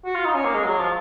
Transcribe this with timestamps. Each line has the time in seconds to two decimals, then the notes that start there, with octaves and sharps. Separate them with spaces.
0.05 F#4
0.15 F4
0.25 D#4
0.35 C#4
0.45 A#3
0.54 G#3
0.65 F#3
0.79 F3